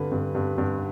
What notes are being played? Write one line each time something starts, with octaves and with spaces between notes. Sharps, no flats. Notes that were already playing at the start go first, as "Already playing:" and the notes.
Already playing: G2 D3 B4
G2
G2
G2